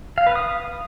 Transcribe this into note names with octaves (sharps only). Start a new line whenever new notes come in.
F5
B4
D#6